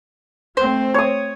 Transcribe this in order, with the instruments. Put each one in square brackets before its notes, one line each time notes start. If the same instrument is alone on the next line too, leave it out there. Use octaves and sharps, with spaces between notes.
[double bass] A3 C4 [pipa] C5
[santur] C#5 D#6